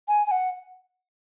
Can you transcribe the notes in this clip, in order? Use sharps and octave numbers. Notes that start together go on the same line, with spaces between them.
G#5
G#5
F#5